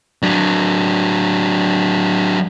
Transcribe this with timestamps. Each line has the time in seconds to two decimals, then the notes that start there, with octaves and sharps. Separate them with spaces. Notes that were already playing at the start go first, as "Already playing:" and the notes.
0.23 F#3 D4